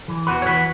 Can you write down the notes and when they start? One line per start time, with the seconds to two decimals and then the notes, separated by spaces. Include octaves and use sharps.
0.08 E3
0.27 E2 F#4 B4
0.42 C#5
0.46 E3 F#4 B4